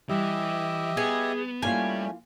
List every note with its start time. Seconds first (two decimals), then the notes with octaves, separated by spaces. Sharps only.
0.09 E3 G3 G4 D#5 E5
0.97 B3 G#4
1.62 G3 A3 A#3 C#4 E4 F4 G#5